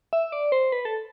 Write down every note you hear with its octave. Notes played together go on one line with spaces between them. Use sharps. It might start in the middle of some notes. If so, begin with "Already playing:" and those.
E5
D5
C5
B4
A4